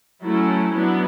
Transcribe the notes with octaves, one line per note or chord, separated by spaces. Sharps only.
F#3 A3 C#4 E4
F#3 B3 D4 E4